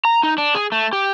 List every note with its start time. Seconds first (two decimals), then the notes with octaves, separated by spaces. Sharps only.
0.05 A#5
0.23 D#4
0.38 D4
0.55 G#4
0.72 A3
0.93 G4